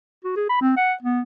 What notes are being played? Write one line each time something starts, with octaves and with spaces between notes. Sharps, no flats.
F#4
G#4
B5
C4
F#5
B3